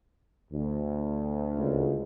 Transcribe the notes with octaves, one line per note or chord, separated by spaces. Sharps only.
D2
C#2